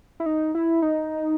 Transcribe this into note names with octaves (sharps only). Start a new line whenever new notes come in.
E4
D#4
E4
D#4